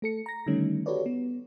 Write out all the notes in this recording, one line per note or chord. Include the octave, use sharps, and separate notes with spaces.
A3 A4 C#7
A#5 A#6
D3 D#3 G3 A3 C#4 D#4
F#4 G4 A4 B4 C#5 D5
B3